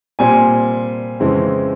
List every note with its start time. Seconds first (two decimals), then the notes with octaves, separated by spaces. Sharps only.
0.19 A#2 G3 C4 G#5
1.20 F2 C#3 E3 G#3 C4